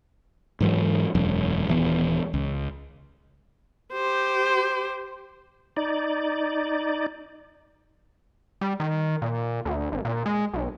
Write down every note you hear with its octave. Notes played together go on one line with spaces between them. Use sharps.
G#2 E3 F#3
E1 F#2
D#1 E3 B3
C#2
G4 C5
D#4 D5
G3
D#3
A#2
D2
G#1
A#2
G#3
B1